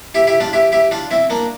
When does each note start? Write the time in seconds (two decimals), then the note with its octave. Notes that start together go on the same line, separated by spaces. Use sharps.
0.15 E4 G4
0.27 E4 G4
0.40 D4 F4
0.53 E4 G4
0.72 E4 G4
0.91 D4 F4
1.11 C4 E4
1.30 A#3 D4